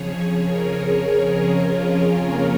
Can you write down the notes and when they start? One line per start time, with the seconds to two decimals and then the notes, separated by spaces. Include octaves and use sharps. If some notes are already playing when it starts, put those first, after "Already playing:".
Already playing: F2 C#3 F3 G#4 C#5
0.15 C#5
0.44 A#4
0.74 G#4
1.03 G#4
1.33 C#4
1.64 F4
1.93 C#4
2.22 A#3